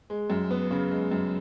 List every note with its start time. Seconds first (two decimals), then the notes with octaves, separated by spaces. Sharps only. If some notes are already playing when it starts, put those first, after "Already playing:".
0.10 G#3
0.30 F#2
0.51 B3
0.71 C#3
0.91 G#3
1.11 F#2